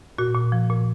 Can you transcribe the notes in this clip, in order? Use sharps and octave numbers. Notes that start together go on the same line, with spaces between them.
A#2 F#4
A#2
F3
A#2